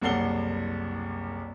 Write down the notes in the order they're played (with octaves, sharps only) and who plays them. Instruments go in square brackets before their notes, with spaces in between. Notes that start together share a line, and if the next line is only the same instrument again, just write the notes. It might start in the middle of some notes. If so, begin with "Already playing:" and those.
[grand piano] F#1 C2 A4 F#5 C7 G7